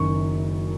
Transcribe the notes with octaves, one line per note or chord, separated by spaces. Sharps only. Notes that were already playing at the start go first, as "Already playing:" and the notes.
Already playing: F#1 F#2 D#3 C#6